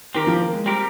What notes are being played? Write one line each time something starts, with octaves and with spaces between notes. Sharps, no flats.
D#3 C4 G4 A#4
F3
A#3
G#3
G3 C4 G4 A#4